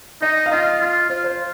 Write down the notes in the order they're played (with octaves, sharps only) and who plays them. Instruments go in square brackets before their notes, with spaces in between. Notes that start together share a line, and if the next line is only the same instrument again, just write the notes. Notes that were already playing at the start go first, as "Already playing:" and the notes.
[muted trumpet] D#4 [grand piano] D#5
[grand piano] F5
[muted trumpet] F4 [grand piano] D#5
[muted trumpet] F4
[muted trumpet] F4 [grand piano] C5
[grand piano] C5